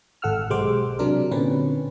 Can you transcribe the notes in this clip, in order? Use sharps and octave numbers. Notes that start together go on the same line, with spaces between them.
G#1 A4 F#5 E6 F6
B1 G#3 G4 C5 D6
C3 F#3 D4 A#4
A#2 D3 C4 C#4 B4